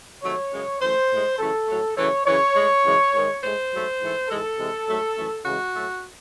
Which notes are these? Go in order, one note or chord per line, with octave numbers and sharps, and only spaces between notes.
C3 D#3 F#3 A3 C#5
F#2 C#3 G#3
F#2 E3 A3 C5
A2 G#3
F#2 C#3 E3 A3 A4
A2 F#3 A3
F#2 C#3 E3 A3 C#5
F#2 C#3 E3 C#5
A2 G#3
F#2 C#3 E3 G#3
G#2 D#3 G#3
A2 G#3 C5
G#2 F#3 A3
G#2 E3 A3
G#2 E3 G#3 A4
C3 E3 G#3
G#2 F#3 A3
F#2 E3 A3
C#3 E3 G#3 F#4
A2 F#3 A3